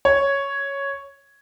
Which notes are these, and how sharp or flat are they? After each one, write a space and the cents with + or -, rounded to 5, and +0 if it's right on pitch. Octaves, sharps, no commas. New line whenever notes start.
C#5 +0